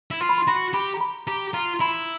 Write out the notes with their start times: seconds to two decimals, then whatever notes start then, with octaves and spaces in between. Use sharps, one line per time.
0.11 E4
0.21 F4 C6
0.29 B5
0.38 C6
0.47 F#4 B5
0.73 G4 B5
0.94 A#5
1.01 B5
1.27 G4 A#5
1.54 F4 A#5
1.74 C6
1.80 E4 B5